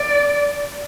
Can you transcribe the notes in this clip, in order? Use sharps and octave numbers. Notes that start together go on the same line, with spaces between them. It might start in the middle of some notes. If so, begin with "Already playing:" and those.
Already playing: D5